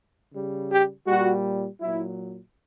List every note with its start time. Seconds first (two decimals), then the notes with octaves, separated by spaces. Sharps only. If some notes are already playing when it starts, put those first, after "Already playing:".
0.32 C#3 G3
0.69 G4
1.06 A#2 G3 F#4
1.81 A#2 F#3 E4